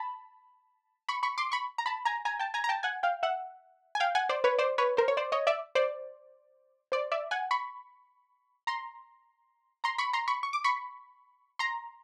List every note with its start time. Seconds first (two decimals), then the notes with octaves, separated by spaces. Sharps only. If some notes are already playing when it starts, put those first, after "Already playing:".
Already playing: A5 B5
1.09 B5 C#6
1.23 B5 C#6
1.38 C6 D6
1.52 B5 C#6
1.78 A#5
1.86 A5 B5
2.05 G#5 A#5
2.25 G#5 A#5
2.39 G5 A5
2.54 G#5 A#5
2.64 A#5
2.69 G5 A5
2.83 F#5 G#5
3.03 F5 G5
3.23 E5 F#5
3.95 G#5
4.00 F5 G5
4.15 F#5 G#5
4.29 C5 D5
4.44 B4 C#5
4.59 C5 D5
4.78 B4 C#5
4.97 A#4 C5
5.08 C#5
5.17 C5 D5
5.32 C#5 D#5
5.47 D5 E5
5.75 C5 D5
6.92 C5 D5
7.12 D5 E5
7.31 F#5 G#5
7.51 B5 C#6
8.67 A#5 C6
9.84 A#5 C6
9.98 B5 C#6
10.13 A#5 C6
10.28 B5 C#6
10.43 C#6
10.53 D6
10.64 B5 C#6
11.59 A#5 C6